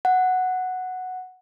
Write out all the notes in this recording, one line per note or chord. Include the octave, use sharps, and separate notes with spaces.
F#5